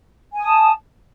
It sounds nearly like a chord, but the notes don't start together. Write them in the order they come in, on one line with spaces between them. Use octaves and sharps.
G#5 D#6 A5